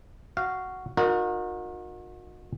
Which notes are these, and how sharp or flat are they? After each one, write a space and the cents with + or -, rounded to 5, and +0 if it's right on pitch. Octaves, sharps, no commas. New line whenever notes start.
F#4 +0 F5 -10
D#4 +0 F#4 -40 A#4 +0